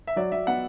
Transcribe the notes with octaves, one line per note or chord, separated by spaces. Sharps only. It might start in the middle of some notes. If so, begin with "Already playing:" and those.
E5
F#3 D5
F#3 E5
B3 F#5